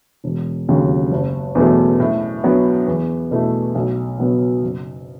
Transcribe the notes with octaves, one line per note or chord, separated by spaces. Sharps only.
E1
D#2 C#3 F#3
F#1
E2 B2 F#3 A3
A2
F#3 B3
E2
B2 A3 E4
B1
B2 F#3 B3
F#1